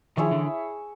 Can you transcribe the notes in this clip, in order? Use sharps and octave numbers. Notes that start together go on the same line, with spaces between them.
D#3 F3 E4 G#4 C#5 E5
D3 E3